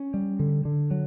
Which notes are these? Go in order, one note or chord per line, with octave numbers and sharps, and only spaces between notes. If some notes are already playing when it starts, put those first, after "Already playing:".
Already playing: C#4
G3
D3
D3
F#3